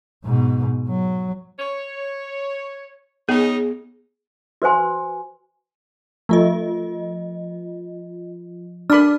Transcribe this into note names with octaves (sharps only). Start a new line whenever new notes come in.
G#2 B2
F#3
C#5
C#3 B3 D#4 G#4
F#4 B4 C5 G#5 C6
F3 A3 F4 D#5
D4 A#4 B5 D6 F6